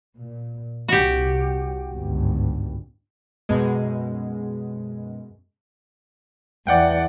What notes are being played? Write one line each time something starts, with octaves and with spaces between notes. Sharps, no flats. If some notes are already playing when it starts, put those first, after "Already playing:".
A#2
C2 C3 F#4 G4
G1 C#2 G#2
F#2 B2 G#3
E2 D5 F#5 G5